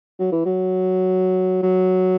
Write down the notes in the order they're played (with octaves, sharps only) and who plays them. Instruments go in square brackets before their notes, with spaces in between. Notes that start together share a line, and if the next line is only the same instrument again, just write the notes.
[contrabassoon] F#3
E3
F#3
F#3